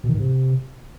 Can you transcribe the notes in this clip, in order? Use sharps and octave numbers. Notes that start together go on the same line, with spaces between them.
B2
D#3
G#2
C3